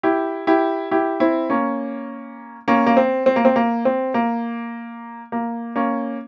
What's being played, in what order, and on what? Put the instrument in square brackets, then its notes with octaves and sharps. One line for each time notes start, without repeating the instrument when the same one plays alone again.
[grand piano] E4 G4
E4 G4
E4 G4
C4 E4
A#3 C#4
A#3 C#4
A#3
C4
C4
A#3
C4
A#3
C4
A#3
A#3
A#3 C#4